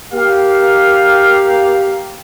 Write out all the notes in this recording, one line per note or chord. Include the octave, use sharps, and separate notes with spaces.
A#3 G4 F5